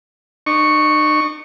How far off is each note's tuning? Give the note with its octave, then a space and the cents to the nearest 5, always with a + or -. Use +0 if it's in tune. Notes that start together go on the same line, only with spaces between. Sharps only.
D#4 -45 C#6 +0